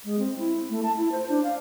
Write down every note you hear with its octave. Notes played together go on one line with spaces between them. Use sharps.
G#3
C4
E4
A3
A5
E4
C5
D4
F5